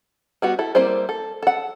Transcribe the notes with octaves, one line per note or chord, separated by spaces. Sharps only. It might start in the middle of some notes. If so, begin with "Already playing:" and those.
G3 B3 F#4
E4 A4
G3 A#3 C4 E4 C5
A4
A4 F#5